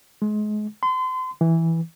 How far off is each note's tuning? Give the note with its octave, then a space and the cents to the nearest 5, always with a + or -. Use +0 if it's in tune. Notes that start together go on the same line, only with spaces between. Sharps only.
G#3 +30
C6 -35
E3 -5